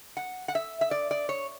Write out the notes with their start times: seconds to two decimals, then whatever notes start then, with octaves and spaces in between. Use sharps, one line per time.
0.17 F#5
0.48 F#5
0.55 E5
0.81 E5
0.91 D5
1.11 D5
1.29 C#5